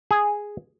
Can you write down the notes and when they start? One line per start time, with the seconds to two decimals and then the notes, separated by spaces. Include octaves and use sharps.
0.11 G#4